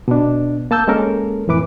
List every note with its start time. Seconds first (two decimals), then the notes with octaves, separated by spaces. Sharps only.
0.08 B2 D4
0.71 A#3 A5 E6 G6
0.88 G#3 A#3 C#4 A4 A#4
1.48 F2 A2 E3 B4 D6